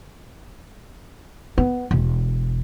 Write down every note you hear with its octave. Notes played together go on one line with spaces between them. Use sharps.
B3
E1